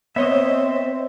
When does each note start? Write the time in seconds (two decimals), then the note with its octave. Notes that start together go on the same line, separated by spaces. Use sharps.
0.16 B3 C4 C#5 D#5 E5 C6